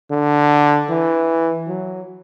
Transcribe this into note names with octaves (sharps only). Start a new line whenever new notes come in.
D3
E3
F#3